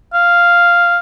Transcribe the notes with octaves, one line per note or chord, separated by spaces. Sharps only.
F5